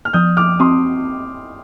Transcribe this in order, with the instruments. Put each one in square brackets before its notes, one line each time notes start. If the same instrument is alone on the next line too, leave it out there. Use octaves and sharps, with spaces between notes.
[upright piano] F6
[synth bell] F3 [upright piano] D#6 G6
[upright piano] D6 F6
[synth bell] C4 [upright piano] C6 D#6